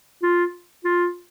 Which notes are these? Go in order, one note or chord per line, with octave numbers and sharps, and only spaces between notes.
F4
F4